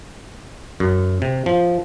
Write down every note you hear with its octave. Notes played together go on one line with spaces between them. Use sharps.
F#2
C3
F3